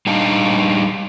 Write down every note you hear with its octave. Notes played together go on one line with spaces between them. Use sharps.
G3 D4 D#4 F5 A5